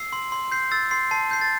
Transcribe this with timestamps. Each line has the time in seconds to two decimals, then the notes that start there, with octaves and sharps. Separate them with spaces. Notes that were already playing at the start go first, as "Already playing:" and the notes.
Already playing: E6 C7
0.13 C6
0.32 C6
0.52 G6 C7
0.71 E6 A6
0.91 C6 C7
1.11 A5 C7
1.31 G6 C7
1.41 A6